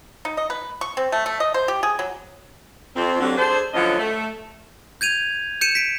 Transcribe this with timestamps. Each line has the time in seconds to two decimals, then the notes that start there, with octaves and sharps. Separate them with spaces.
0.25 D#4
0.37 D#5
0.50 B4
0.81 C#6
0.97 C4
1.12 A3
1.26 A3
1.40 D#5
1.54 C5
1.68 G4
1.83 G#4
1.99 F#3
2.96 F2 C4
3.21 D3 F#3 G3 A#3 C4
3.38 D4 G#4 A4 C5
3.74 A2 D3 F3 F#3 C#4 D#5
3.99 A3
5.01 G6 G#6 D#7 F7
5.61 G6 C#7 D#7 E7
5.75 B6 D7